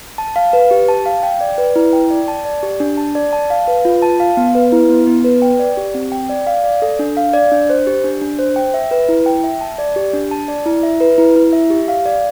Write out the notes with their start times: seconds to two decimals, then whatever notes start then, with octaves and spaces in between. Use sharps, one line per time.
0.18 A5
0.36 F5
0.53 B4
0.71 G4
0.89 A5
1.06 F5
1.23 G5
1.41 D5
1.58 B4
1.76 E4
1.93 G5
2.11 D5
2.28 A5
2.45 D5
2.63 G4
2.80 D4
2.97 A5
3.15 D5
3.33 A5
3.50 F5
3.68 B4
3.85 F4
4.02 A5
4.20 F5
4.37 B3
4.55 B4
4.72 E4
4.90 B3
5.07 B3
5.24 B4
5.42 G5
5.59 D5
5.77 G4
5.94 C4
6.12 G5
6.29 D5
6.47 F5
6.64 D5
6.82 A4
6.99 D4
7.17 F5
7.34 D5
7.52 D4
7.70 C5
7.87 G4
8.04 D4
8.22 D4
8.39 C5
8.56 G5
8.74 E5
8.91 B4
9.09 E4
9.26 G5
9.44 E5
9.61 A5
9.78 D5
9.96 G4
10.13 D4
10.31 A5
10.48 D5
10.65 E4
10.83 E5
11.00 B4
11.18 E4
11.36 E4
11.53 E5
11.70 G4
11.88 F5
12.06 D5